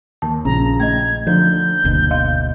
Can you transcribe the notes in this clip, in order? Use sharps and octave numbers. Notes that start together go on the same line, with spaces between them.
D#2 A5
A#1 C#3 A#5
A3 D#5 G#6
D3 F3 D#4 G6
F#1 D2 B2
D#5 F5